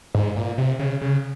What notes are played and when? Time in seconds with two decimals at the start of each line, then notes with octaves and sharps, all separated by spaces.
0.15 G#2
0.36 A#2
0.58 C3
0.79 C#3
1.01 C#3